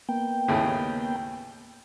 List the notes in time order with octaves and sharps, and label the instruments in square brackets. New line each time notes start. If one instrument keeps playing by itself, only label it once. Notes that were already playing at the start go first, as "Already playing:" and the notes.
[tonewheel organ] A#3 B3 G5
[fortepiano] D#2 A2 C#3